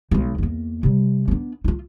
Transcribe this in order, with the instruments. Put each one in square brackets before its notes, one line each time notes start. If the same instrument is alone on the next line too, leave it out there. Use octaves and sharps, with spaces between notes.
[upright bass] B1 G#3
E2 A#3
C3 G3
B3 D4
D#4 F4